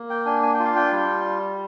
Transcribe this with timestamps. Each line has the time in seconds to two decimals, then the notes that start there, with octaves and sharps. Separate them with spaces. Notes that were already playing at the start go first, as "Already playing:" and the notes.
Already playing: A#3
0.10 G5
0.26 D4 G#5
0.43 G#5
0.54 G5
0.59 F4
0.65 F5
0.76 G5
0.92 G3